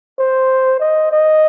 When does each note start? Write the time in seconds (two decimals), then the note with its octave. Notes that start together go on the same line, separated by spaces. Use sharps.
0.19 C5
0.80 D#5
1.12 D#5